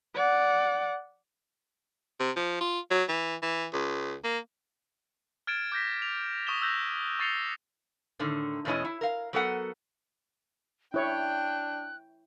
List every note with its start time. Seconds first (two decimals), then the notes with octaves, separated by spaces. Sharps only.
0.15 D5 F#5
2.20 C3
2.36 F3
2.61 F4
2.91 F#3
3.09 E3
3.43 E3
3.73 C#2
4.24 A#3
5.47 F6 G#6 A6 D7 E7
5.72 D6 G6 A#6 B6
6.02 F7
6.47 C#6 D#6 A#6 E7 G7
6.62 E6 F#6 G6 A#6
7.19 C#6 A6 C7 C#7 F7 G7
8.19 A2 D3 D#3
8.65 E2 B2 A3 C#4 E4 D#5
8.85 E4
9.01 A#4 F5
9.33 F#3 B3 A4 A#4 F#5
10.94 D4 E4 C#5 G5 F#6